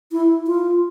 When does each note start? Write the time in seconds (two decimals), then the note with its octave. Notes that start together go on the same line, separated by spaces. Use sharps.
0.12 E4
0.46 F4